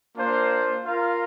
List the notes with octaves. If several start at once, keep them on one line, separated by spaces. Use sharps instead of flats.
A#3 D4 F4 C5
F4 A#4 F5